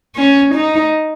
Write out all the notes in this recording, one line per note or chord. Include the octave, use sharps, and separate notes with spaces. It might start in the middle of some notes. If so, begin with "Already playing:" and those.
C#4
D#4